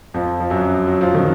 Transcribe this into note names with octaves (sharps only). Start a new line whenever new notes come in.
F2 F3
F3
F#2 F#3
F#3
F3
D#3